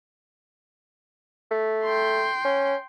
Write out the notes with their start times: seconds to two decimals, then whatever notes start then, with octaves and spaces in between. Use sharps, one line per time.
1.51 A3
1.84 G5 C6
2.45 C#4